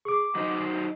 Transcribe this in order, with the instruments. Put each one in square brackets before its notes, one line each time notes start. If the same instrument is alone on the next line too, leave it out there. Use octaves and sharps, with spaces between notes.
[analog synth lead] G#4 [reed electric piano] C#6 D6
[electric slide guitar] F#3 D#4 C5 [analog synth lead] D#5